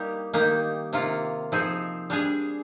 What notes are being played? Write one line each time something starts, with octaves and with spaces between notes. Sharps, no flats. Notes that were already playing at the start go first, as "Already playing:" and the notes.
Already playing: G3 A#3 D#4 G4
D#3 A#3 D#4 G4
C3 D#3 A#3 F4
F3 C4 D#4 G#4
G3 D4 G#4